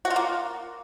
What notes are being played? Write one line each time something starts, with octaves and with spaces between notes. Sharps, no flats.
F#4
F4
A#3